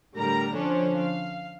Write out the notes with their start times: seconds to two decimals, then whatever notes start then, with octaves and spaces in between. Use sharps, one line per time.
0.15 A2 D3 G3 A#4 A#5
0.54 D3 F3 C#4 D4 C5 C#5
0.99 F5